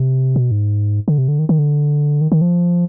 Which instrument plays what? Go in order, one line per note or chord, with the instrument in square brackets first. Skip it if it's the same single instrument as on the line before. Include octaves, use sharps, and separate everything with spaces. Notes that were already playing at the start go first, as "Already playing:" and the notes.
Already playing: [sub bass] C3
B2
G#2
D3
C3
D3
D#3
D#3
D3
D#3
D#3
F3